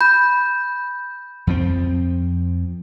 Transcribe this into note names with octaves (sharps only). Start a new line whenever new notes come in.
B5 G6
F2 F3 C4